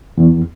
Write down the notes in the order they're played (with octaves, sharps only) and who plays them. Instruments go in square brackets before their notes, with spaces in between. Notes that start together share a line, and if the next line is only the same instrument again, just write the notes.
[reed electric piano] E2